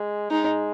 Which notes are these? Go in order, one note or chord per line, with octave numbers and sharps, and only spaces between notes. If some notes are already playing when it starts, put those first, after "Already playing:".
Already playing: G#3
G#3 D#4